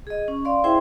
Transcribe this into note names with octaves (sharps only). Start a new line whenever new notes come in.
G#4 D#5
C#4
D5 F5 C6
E4 G#4 C5 E5 G5 C6